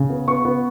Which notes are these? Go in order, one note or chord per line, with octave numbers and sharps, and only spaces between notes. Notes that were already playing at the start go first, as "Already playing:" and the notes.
Already playing: C#3
B3
B3 C#6
B3